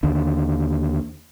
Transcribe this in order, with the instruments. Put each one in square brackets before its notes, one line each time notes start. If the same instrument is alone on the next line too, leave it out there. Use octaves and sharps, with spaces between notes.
[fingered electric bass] D#2 D3